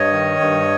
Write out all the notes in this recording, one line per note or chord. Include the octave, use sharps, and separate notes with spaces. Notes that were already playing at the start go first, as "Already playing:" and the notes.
Already playing: G2 C#5 D#5
D#3
G2